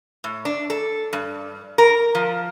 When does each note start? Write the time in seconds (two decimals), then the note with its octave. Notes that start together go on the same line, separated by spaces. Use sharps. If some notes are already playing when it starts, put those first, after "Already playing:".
0.24 A2
0.45 D4
0.70 A4
1.13 G2
1.78 A#4
2.15 F3